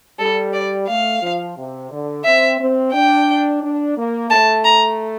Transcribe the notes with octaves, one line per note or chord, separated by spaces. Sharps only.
G3 A4
D5
A3 F5
F3
C3
D3
C4 E5
C4
D4 G5
D4
A#3
A3 A5
A#5